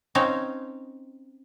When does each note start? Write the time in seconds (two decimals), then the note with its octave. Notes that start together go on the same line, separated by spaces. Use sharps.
0.15 C4 C#4 D#4 C#5 F5